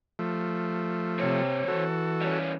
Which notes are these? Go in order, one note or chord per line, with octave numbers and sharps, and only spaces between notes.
F3 A3
C3 C4 C#5
E3 F#4 A4
G3 C#4